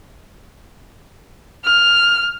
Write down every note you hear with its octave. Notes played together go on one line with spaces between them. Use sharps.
F6